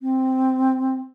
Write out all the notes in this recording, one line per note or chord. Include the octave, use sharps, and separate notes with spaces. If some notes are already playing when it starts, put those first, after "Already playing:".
C4